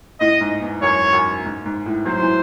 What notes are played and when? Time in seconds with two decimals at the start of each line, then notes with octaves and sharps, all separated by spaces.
0.20 A2 D#5
0.40 G#2
0.61 E2
0.82 F#2 C#5
1.13 F#2
1.45 G#2
1.65 G#2
1.86 A2
2.06 F#3 C5
2.21 E3